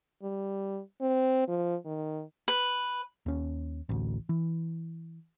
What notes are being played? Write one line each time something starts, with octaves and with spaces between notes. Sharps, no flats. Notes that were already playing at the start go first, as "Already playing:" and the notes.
G3
C4
F3
D#3
B4
D#2 C#4
A1 D2
E3